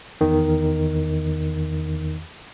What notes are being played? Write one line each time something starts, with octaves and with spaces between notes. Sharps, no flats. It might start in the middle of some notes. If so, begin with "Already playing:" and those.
E2 D#3